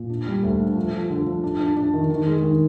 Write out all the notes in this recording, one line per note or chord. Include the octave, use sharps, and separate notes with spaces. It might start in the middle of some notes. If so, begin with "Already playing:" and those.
Already playing: A#2
D4
G3
D2
D4
F3
F3
D3
F3
D4
D4
D4
D#3
D#3
G#3
D#3